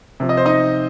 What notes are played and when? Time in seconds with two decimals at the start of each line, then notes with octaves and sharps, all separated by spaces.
0.20 C3 F3
0.29 D#5
0.37 C5
0.45 D#4 D#5